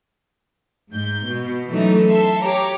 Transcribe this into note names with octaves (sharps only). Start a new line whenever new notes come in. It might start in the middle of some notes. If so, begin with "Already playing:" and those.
G#2 G6
B2
E3 F#3 A3 C#4 D#4
A4 E5 C6
G4 C#5 A#5 D6